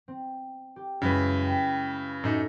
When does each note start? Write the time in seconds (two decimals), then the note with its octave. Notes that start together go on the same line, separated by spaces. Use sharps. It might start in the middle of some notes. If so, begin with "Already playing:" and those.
0.08 C4
0.76 G4
1.02 F#2 C#3 F#3 G#3 E4 B4
1.43 G5
2.24 F#2 A2 D#4 E6 E7